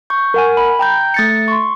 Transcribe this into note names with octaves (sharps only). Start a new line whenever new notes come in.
C#6 G6
A#4 F#5 G#5
B5
G5 A#5 G6
A3 A6 C#7
C6 C#6